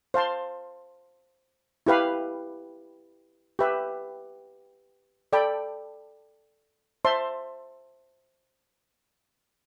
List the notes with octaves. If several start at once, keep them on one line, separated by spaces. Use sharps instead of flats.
C5 F5 A5 C6
E4 G4 B4 F5 B5
G4 B4 E5 B5
A4 D5 G5 B5
C5 E5 A5 C6